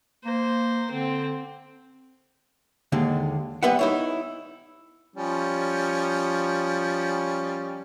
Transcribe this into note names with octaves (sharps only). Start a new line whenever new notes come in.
A#3 C5
D3 C4
D#2 D3 G#3
G3 B3 B4 E5 F#5
D#4 E4 C#5
F3 G3 C#4